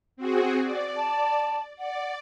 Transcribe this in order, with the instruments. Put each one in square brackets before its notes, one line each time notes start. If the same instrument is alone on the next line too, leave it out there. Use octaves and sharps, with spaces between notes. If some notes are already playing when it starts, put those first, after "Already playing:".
[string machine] C4 F#4 G#4
D5
[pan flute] A5
[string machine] D5 [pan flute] F#5